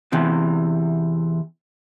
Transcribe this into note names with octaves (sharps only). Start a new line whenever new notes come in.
E2 C3 E3